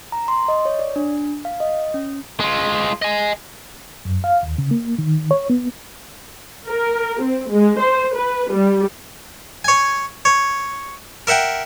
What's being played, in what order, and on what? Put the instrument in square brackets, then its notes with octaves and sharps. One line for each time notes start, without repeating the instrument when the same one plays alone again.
[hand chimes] A#5
C6
D#5
C#5
D5
D4
F5
D#5
C#4
[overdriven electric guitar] G#3 F4
D#5 G#5
[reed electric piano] F#2
F5
D#2
C#3
A#3
D#3
C#5
B3
[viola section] A#4
C4
G#3
C5
B4
G3
[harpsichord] C#5 G#5
C#5
A#4 E5 F#5 G5